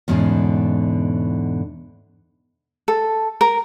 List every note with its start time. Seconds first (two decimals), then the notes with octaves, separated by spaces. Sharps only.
0.08 E2 G#2 B2 D3 C#4
2.88 A4
3.41 A#4